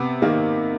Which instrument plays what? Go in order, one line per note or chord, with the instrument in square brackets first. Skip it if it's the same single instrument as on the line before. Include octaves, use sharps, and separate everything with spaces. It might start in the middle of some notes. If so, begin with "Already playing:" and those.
Already playing: [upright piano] C3 B3
D#3 A#3